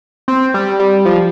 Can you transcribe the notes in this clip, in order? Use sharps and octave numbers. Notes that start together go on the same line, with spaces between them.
C4
G3
G3
F3